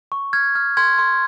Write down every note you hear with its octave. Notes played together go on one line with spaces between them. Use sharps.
C#6
F6 G#6
F6
C6 G#6
C6